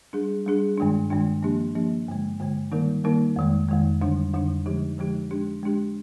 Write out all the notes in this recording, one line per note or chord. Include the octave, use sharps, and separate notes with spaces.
G3 D4 G#4
G3 D4 G#4
G2 D#3 G#3 D4
G2 D#3 G#3 D4
F3 A#3 D4 G4
F3 A#3 D4 G4
G2 D3 G#3
G2 D3 G#3
D#3 G3 A#3 D#4 A#4
D#3 G3 A#3 D#4 A#4
F2 D#3 G#3
F2 D#3 G#3
F2 D3 G3 D4
F2 D3 G3 D4
D3 F3 G#3 D#4 G4
D3 F3 G#3 D#4 G4
G#3 D4 G4
G#3 D4 G4